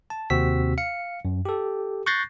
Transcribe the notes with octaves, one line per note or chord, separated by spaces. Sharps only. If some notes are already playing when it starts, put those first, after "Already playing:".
A5
D#2 C3 C4 F#4 E6 B6
F5 C#7
F#2
G4 A4
C#6 F#6 G6 A6 A#6 C7